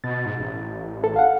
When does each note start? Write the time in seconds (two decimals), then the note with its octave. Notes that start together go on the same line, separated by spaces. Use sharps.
0.04 B2 A6
0.26 G#2
0.40 A1
1.04 A4
1.16 F5 F#5